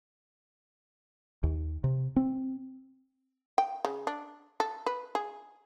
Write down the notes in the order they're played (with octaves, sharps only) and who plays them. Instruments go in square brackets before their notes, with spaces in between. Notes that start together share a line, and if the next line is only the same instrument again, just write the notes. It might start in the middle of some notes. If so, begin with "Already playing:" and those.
[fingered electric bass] D#2
C3
C4
[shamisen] G5
C#3
D4
A4
B4
G#4